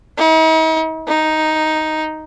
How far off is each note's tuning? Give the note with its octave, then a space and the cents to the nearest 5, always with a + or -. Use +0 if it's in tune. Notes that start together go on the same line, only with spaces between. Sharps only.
D#4 +45
D#4 +5